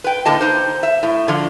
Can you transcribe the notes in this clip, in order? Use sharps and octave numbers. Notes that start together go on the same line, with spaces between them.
B4 G5
A2 D3 A#3 A4 D#5 A5
D#4 C5
E5
A2
D3 F3